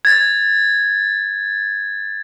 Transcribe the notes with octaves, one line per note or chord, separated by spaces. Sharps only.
G#6 A6